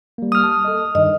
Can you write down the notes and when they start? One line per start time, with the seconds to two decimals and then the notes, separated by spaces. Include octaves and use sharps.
0.18 G3 A#3
0.32 D#6 F6
0.43 A5
0.65 A4 D#5
0.95 G2 D#3 D#5